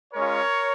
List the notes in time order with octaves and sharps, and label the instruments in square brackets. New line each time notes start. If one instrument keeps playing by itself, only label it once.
[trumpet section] G#3 C#4 F4 A#4 C#5